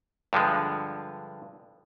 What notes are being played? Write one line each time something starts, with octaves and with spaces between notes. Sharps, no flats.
G2 D3 F3 G#3